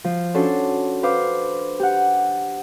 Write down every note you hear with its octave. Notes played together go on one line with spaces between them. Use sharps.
F3
C#4 D4 F#4 A4 C6
B4 C5 F5 D6
G4 F#5